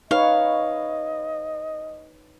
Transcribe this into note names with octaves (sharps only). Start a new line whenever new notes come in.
D#4 B4 C#5 D#5 F5